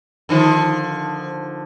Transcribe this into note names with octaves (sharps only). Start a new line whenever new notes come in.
D3 D#3 F3